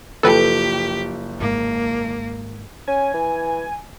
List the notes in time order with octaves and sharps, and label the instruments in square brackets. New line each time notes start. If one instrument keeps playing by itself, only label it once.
[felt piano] F#1 F3 G5 [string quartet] G4 [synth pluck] A4 B4
[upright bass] G#1 G#2 [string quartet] A#3
[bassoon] C#4 [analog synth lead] G#5
[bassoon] E3